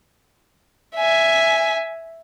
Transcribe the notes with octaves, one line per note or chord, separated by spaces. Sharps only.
E5 G#5